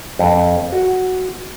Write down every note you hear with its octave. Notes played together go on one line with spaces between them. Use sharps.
F2
F#4